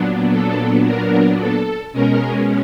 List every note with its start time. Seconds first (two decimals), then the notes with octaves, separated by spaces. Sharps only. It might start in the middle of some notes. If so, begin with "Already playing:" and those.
Already playing: A#2 F#3 B3 D4
0.31 A4
0.85 A#4
1.39 A4
1.93 B2 G#3 C#4 A#4